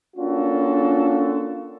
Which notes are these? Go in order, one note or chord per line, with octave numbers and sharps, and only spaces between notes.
A#3 C#4 D4 F4 F#4 A4